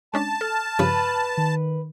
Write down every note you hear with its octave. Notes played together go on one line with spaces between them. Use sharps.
G#3 C#4 D4 A5
A4 F6
G2 C#3 F3 B4
D#3